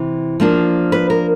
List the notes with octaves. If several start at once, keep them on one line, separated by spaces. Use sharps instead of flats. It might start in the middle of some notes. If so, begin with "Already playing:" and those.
Already playing: C3 E3
F3 A#3 D4 F4
B4
A#4